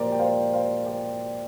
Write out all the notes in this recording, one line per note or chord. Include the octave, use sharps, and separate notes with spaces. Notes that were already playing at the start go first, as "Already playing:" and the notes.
Already playing: A#2 F3 G4 A#4 C5 D5
G5
C5 F5
C5 F5
D5 G5